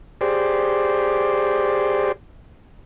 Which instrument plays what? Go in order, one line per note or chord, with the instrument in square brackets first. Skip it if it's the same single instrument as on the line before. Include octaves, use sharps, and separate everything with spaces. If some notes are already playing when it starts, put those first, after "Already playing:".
[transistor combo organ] G4 G#4 C5 D5